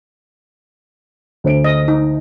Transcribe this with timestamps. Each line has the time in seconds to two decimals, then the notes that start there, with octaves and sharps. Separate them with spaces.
1.44 D2 C5 D7
1.64 D#5
1.88 D#4